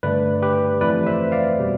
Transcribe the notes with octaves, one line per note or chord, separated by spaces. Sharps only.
G2 D3 A3 B4 D5
G4 B4
F2 E3 A3 B4 D5
C5 E5
D5 F5
B2 G3